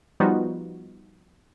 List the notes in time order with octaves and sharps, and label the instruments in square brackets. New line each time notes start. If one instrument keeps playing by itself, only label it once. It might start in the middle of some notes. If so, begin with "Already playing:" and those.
[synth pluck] F3 G3 B3 D#4 F4 F#4